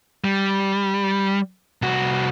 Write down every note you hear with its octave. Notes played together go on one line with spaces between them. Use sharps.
G3
C2 F#4